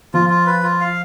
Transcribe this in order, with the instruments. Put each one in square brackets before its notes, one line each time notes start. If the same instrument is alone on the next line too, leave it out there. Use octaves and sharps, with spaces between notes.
[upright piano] F3 [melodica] F4
[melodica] F4
B4
F4
F5